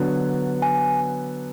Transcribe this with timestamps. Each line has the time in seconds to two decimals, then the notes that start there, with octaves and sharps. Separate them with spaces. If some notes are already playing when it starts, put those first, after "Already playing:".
Already playing: D3 F#3 B3
0.62 G#5